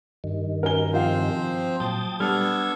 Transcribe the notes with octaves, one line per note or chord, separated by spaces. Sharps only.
G2 D#3
C#4 F#4 A#4 G#5 G7
F3 C4 F4 C5 F5
A#2 F#3 G5 A5 D#6
G3 B3 D4 A4 F6 G#6